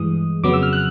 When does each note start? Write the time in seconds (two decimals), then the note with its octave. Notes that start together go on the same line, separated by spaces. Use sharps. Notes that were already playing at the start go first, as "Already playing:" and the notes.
Already playing: G2 E3 G#3 D#6
0.44 F2 C#3 F#3 B3 D6
0.53 E6
0.63 F6
0.73 F#6